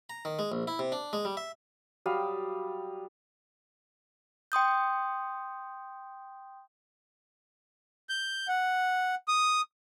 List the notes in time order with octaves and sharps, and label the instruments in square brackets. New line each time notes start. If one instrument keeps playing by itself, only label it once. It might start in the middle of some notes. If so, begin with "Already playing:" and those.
[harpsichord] A#5
D#3
G#3
A#1
E4
C3
D4
G#3
G3
E5
[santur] F#3 G3 F5 D#6
[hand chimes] G5 C6 D#6 G6
[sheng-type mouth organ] G6
F#5
D#6